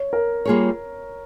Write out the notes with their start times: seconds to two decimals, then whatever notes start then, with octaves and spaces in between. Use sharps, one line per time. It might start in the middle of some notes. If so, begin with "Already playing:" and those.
Already playing: C#5
0.13 A#4
0.45 G3 A#3 F4 G#4 C#5